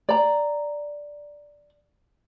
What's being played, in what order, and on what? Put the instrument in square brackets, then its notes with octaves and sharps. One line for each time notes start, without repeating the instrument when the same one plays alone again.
[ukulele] D5 A#5